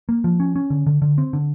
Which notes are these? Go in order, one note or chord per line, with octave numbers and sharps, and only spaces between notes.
A#3
F3
C#4
C#4
D3
D3
D3
C4
D3